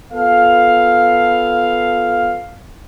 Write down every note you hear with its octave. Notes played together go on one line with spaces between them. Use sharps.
B3 F4 A4 F5